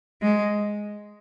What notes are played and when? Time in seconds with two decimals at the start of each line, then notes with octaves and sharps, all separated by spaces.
0.22 G#3